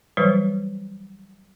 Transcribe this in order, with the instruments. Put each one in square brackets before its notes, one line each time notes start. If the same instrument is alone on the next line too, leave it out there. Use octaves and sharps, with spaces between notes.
[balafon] E3 F#3 G3 B4 C5